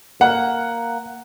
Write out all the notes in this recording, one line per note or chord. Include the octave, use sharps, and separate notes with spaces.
A#3 F#5